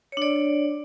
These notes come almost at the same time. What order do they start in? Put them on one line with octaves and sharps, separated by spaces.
C#5 D4 D5